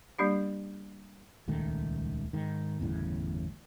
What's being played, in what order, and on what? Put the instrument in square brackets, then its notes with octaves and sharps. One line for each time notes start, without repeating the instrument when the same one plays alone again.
[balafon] G3 A#3 D4 G4
[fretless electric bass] D#1 C#2 D#3 A3
G#2 D#3
G1 E2 A2 C#3